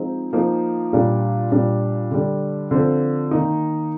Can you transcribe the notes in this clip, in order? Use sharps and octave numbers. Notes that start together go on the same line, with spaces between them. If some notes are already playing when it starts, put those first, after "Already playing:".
Already playing: F3 G#3 C4 D#4
F3 A#3 D#4
A#2 G3 D4
A#2 G3 D4
D3 G3 D4
D3 F3 C4
D#3 A#3 D#4